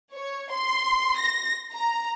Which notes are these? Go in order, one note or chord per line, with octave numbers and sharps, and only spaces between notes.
C#5
C6
A#6
A#5